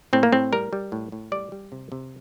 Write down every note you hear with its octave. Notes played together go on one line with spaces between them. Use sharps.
A2 C4
A#3
A2 C4
G3 A#4
G3
A2
A2
G3 D5
G3
C3
C3